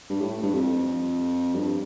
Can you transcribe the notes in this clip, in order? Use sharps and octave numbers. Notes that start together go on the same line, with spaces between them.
G2
A2
G2
F2
G2